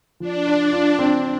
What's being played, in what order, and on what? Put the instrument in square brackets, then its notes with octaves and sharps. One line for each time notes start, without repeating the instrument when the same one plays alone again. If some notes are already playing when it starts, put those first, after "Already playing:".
[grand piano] F3 [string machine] D4
[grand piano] F4
F4
C4